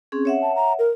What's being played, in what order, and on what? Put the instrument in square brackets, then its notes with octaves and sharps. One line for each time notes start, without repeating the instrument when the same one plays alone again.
[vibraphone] C4 C#4 G#4
C#5 E5 F#5
[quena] A5
A#5
A#4